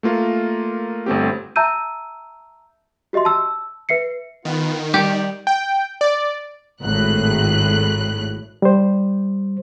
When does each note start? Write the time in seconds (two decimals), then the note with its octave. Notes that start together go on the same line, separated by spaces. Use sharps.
0.03 A3 A#3 F4 A#4
1.06 G1 A3 C4 G4
1.56 E5 A5 A#5 E6 G6 D#7
3.13 F#4 G4 D#5 E5 C6
3.25 A5 E6
3.89 B4 E5 C7 C#7
4.45 D#3 B3 F4
4.94 G3 G4
5.47 G5
6.01 D5
6.81 G#1 A2 F#6
8.62 G3 C5